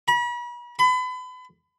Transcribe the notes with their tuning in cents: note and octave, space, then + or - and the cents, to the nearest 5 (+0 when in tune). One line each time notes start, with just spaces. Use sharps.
B5 -40
B5 +35